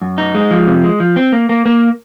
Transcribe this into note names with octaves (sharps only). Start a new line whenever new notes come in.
F#2
D#4
G#3
F3
C3
G#3
F3
C4
A#3
A#3
A#3